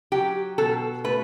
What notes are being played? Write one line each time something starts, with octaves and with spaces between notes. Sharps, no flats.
F#3 G4
B2 A4
A3 B4